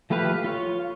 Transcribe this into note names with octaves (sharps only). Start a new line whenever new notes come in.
F3 A3 G4 B4 F5
F4 C#5